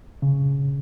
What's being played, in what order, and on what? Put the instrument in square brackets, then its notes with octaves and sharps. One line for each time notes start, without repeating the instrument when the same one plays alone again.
[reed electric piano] C#3